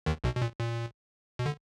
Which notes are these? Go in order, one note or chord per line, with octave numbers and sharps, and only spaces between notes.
D#2 D#3
B1 B2
B2
A#2
A#2
B2
D3